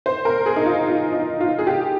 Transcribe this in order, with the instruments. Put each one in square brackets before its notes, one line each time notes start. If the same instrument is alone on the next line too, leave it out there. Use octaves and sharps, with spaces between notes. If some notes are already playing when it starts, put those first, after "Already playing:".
[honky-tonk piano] C5
A#4
G#4
D#4
F4
F4
D#4
F4
G#4
G4